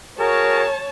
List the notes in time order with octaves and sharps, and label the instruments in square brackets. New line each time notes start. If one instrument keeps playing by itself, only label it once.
[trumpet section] F#4 G#4 A#4 [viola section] C#5 A5